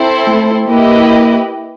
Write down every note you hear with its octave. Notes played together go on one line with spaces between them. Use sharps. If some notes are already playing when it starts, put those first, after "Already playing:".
Already playing: C4 E4 A4 C5
A3
A#3 E4 G4 B4 D#5